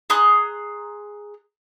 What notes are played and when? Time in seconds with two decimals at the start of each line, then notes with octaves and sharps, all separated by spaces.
0.10 G#4 A#5 C6 F#6